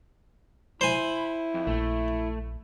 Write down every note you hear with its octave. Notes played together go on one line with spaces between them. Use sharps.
E4 C5 G#5 B5
F2
A#1 A3